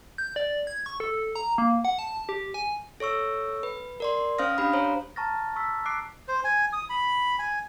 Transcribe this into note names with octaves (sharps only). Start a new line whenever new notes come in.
G6
D5
G#6
C#6
A4
A#5
A#3
F#5
A5
G4
G#5
A4 C#5 C#6 E6
B4
A#4 D5 C6
C#4 C5 F5 D#6 F6 A#6
D4 G4 F5 B5
C5 C#5 A#5
A5 A#5 C#6 F6 A6 A#6
C#6 E6 B6
D6 F#6 C7 D7
C5
G#5
D#6
B5
G#5